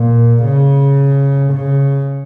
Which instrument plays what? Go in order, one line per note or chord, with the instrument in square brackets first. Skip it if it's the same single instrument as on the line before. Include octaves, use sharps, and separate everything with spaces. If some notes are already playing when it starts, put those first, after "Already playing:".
Already playing: [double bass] A#2
C#3
C#3